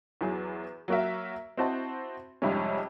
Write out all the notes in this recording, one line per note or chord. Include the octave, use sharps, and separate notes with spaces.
E2 E3 F#3 G#4
F#3 A#3 F#4 A#4 E5
C4 E4 F#4 C5 D#5 A5
F2 G#2 C3 G3 C#4